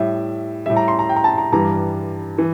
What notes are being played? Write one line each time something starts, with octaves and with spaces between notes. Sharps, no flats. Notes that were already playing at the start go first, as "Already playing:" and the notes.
Already playing: A2 G3 E5
A2 G3 E5
A#5
C6
A#5
G5
A#5
A5
A#5
G2 E3 G3 A#5
E3